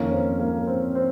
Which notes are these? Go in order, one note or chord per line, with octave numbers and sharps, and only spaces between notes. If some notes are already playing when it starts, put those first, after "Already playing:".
Already playing: F2 D#3 A#3 C#4
C4
A#3
C4
C4